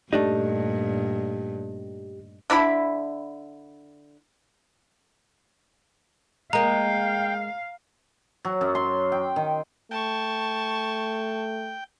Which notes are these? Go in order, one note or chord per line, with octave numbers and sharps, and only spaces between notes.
G2 A#2 A3 D4 D#4 G4
D3 D4 E4 B5
G#3 A#3 F5 G5 A#5
F#3
F#2
C6
G5
D#3
A3 G5 A5 C#6